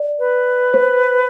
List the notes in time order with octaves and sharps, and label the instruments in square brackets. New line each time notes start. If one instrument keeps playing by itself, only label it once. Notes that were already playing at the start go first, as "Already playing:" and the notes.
Already playing: [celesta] D5
[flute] B4
[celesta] C5